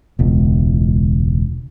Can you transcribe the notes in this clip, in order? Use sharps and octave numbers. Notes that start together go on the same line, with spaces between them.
E1 C#2